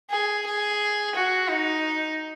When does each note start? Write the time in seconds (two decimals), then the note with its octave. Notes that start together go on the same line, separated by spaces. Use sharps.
0.10 G#4
0.46 G#4
1.15 F#4
1.50 D#4